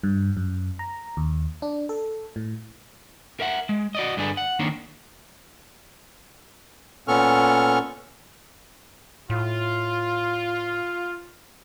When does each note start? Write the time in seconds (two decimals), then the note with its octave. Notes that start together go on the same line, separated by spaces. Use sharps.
0.03 G2
0.37 F#2
0.79 A#5
1.17 D#2
1.62 D4
1.89 A4
2.36 A2
3.40 A#4 E5 F#5
3.69 G#3
3.95 F#4 D5 D#5
4.17 G2 D3 D4 G#4 B4
4.37 F#5
4.59 D#3 A#3 C4 D4 C#5
7.08 A#2 B3 C#4 A4 C#6 F6
9.30 A2 F4